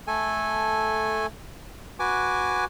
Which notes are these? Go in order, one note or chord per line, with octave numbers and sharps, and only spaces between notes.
A3 A4 G#5
F#4 B4 G#5 D6